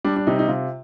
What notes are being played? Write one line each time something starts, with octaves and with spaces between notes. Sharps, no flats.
G3 D4
D4
C3 D#4
D#4
C3 F4